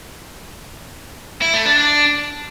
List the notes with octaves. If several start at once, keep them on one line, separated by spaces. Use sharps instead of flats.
E4
A3
D4
D4